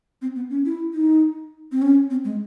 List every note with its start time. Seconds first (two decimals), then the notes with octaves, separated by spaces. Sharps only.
0.22 C4
0.36 B3
0.50 C#4
0.65 E4
0.94 D#4
1.72 C4
1.82 C#4
2.10 C4
2.24 G#3